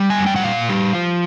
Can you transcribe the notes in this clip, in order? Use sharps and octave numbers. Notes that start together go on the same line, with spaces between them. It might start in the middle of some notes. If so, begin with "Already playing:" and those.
Already playing: G3
G#5
F#2
G5
F#5
A#2 F5
G3
F3